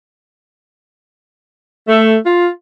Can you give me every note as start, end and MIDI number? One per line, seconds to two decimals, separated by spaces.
1.87 2.17 57
2.24 2.48 65